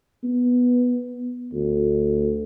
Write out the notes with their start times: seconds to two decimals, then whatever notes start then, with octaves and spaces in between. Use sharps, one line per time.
0.24 B3
1.53 D2